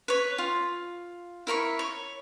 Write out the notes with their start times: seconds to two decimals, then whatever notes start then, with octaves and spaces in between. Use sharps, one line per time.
0.08 B4 C#5
0.38 F4
1.47 E4 A#4 B5 C#6
1.79 C#5